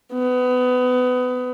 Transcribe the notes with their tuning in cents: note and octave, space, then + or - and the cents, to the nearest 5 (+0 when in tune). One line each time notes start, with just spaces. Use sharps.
B3 +25